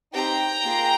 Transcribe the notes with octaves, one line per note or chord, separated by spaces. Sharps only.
C4 D#4 G4 G5 A#5
A#3 F4 G#4